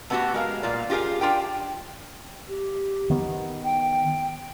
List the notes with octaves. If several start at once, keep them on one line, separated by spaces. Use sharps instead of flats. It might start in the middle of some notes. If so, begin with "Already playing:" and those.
A3 B3 C#4 E4 F#4 G4
G#3 A#4 F5
A#2 G3 F4 D5
F4 G4 G#4 A#4 F5
D4 F4 G4 G5
G4
D#3 B3
G5